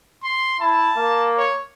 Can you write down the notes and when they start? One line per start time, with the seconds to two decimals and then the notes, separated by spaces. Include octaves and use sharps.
0.23 C6
0.60 E4 A5
0.97 A#3
1.37 C#5